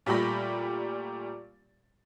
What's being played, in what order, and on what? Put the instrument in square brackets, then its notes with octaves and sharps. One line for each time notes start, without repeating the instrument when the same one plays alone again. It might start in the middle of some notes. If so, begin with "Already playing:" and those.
[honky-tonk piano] A#2 G3 A3 G4 B5 A#6